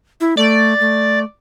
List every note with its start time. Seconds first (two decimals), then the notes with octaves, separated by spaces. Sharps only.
0.20 E4
0.37 A3 D5
0.80 A3